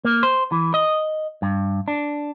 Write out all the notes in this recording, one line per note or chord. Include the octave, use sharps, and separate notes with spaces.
A#3
C5
E3
D#5
G2
D4